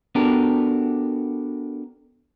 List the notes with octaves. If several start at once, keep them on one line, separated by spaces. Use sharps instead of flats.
B3 D4 F#4 G4 A4 A#4